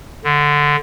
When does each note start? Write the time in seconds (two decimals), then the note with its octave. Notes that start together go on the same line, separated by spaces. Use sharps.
0.24 D3